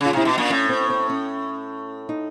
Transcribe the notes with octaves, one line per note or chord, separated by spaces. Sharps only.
C#3 F4
C3 E4
B2 D#4
A#2 D4
A2 C#4
C4
C4
C#4
D#4